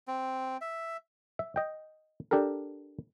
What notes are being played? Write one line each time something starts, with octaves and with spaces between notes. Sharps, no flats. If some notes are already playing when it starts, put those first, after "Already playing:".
C4
E5
E5
D#5 G5
D4 G4 A4 A#4